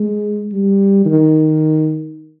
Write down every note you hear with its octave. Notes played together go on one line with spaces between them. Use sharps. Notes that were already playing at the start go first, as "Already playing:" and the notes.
Already playing: G#3
G3
D#3